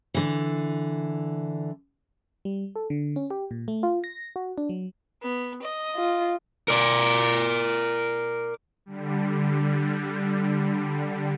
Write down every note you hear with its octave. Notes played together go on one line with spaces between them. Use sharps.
D3 E3
G3
A4
D3
C#4
G4
A#2
A3
F4
A#6
F#4
D4
F#3
B3
D#5
F4
A#4 D5
D3 G3